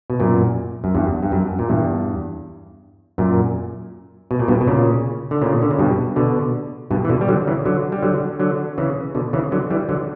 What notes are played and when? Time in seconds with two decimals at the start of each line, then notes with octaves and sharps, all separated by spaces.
0.10 B2
0.20 F#2 A#2
0.84 F#2
0.94 E2 G2
1.23 G2
1.32 F#2
1.59 A#2
1.69 E2 G2
3.18 F#2 A#2
4.31 B2
4.39 A#2
4.48 G2 B2
4.61 B2
4.67 A#2 C#3
5.31 D3
5.42 A#2 C#3
5.62 D3
5.71 C#3
5.79 G2 B2
6.16 B2 D3
6.91 G2 B2
7.05 E3
7.09 B2 D3
7.21 G3
7.29 D3 F#3
7.47 C#3 E3
7.66 D3 F#3
7.92 G3
8.02 D3 F#3
8.40 D3 F#3
8.78 C#3 E3
9.15 B2 D3
9.33 C#3 E3
9.52 D3 F#3
9.70 E3 G3
9.89 D3 F#3